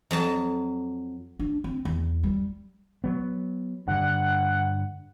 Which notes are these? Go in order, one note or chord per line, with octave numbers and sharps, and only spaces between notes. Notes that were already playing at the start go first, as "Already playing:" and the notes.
F2 F#3 A5
D4
C4
E2
G3
F#3 B3
G2 D3 F#5